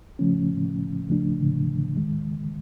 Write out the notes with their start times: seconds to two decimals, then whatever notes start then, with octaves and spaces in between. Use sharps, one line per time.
0.19 C#3 F3 A3 C#4
1.08 D2 C#3 F3 A3 D4
1.97 D#2 D#3 G#3